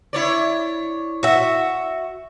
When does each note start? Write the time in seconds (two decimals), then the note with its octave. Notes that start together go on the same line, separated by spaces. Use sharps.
0.13 E4 C#5 D5
1.23 F#4 E5